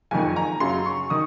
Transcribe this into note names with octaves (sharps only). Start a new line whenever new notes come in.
F#1 F2 D#3 G#5
A#5
F#2 C#3 F#3 C6
C#6
D#3 D#6